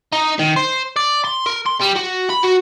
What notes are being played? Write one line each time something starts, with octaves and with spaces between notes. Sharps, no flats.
D#4
D#3
C5
D5
C6
A#4
C6
G3
F#4
B5
F#4